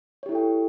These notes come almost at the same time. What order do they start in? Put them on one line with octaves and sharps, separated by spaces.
C#5 G4 E4 A4 G5